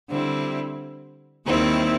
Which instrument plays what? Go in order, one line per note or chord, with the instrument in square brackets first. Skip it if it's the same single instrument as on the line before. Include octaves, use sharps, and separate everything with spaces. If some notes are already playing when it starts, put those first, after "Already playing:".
[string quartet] D3 G3 C4 E4
D#2 D#3 G3 C4 E4